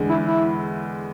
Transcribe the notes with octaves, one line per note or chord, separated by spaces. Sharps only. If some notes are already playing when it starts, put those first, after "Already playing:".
Already playing: E2 D3 G#3
E4
E4